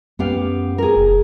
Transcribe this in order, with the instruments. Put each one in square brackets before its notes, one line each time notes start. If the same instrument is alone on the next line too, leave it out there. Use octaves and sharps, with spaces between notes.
[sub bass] F#2 [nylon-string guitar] B3 G4 F5
[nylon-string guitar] G#4 A#4
[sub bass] F1